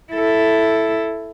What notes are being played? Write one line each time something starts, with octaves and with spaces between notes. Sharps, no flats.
E4 A4